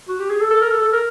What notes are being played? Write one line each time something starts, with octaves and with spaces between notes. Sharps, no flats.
F#4
G4
G#4
A4
A4
A#4
A4
A4
A#4